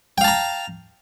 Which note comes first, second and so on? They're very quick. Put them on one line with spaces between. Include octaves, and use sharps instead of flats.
G5 F5 A5 A#5